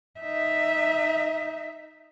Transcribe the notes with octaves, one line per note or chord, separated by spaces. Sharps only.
D#4 E5